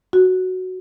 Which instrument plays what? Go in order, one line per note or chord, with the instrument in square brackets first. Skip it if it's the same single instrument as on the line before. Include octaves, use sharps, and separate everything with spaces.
[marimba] F#4